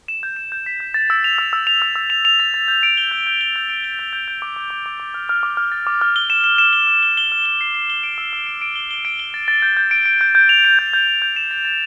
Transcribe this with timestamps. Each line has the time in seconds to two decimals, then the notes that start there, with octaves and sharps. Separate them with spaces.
0.08 E7
0.23 G6
0.37 E7
0.52 G6
0.66 B6
0.80 G6
0.94 A6
1.10 E6
1.24 F7
1.38 E6
1.53 E6
1.67 F7
1.82 E6
1.95 E6
2.10 F7
2.25 F7
2.40 A6
2.54 A6
2.68 G6
2.83 D7
2.97 G7
3.11 G6
3.27 G6
3.41 G7
3.56 G6
3.70 D7
3.84 G7
3.99 G6
4.13 G6
4.28 G6
4.42 D6
4.56 D6
4.70 D6
4.86 D6
5.00 D6
5.14 F6
5.29 F6
5.43 D6
5.57 F6
5.72 A6
5.87 D6
6.01 F6
6.16 G7
6.30 E7
6.44 E7
6.58 E7
6.73 G7
6.87 F6
7.03 G7
7.17 G7
7.32 F6
7.46 G7
7.61 C7
7.75 C7
7.90 G7
8.03 D7
8.18 E6
8.33 E6
8.47 D7
8.62 D7
8.76 G7
8.91 G7
9.05 D7
9.20 G7
9.34 A6
9.48 A6
9.62 G6
9.77 G6
9.91 D7
10.06 D7
10.21 G6
10.35 G6
10.49 F7
10.64 D7
10.79 G6
10.93 G6
11.07 G6
11.22 G6
11.36 E7
11.51 A6
11.65 A6